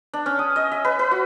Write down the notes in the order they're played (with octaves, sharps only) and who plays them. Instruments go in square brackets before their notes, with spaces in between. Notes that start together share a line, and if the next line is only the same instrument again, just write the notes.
[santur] D4
C#4
D#6
D#5
E5
B4
B4
F#4